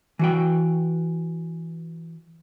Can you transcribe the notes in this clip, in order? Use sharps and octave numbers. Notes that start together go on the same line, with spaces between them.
E3 F#4 G5